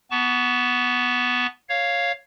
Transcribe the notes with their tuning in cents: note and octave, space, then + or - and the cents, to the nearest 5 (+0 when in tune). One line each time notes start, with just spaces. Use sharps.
B3 +0 A5 +0 C#6 +30
C#5 +0 F5 +0